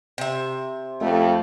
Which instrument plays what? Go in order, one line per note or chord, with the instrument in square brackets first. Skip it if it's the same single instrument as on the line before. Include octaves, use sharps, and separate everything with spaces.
[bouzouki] C3 E5
[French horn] F2 [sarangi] A3